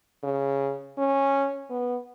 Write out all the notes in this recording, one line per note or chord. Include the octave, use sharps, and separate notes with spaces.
C#3
C#4
B3